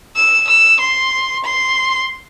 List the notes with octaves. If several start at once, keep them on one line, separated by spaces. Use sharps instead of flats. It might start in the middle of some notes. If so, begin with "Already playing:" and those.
E6
E6
C6
C6